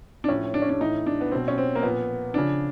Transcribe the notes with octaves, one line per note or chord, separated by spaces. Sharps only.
D4
A2 F3 C#4
D4
C#4
D4
A2 E3 D#4
D4
B3
B2 F#3 C4
C#4
C4
A#3
A#2 F3 B3
C#3 F3 D4